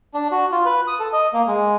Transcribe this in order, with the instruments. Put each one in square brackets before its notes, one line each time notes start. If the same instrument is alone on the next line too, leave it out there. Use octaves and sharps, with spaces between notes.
[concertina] D4
F#4
F4
B4
D#6
A4
D#5
A#3
G#3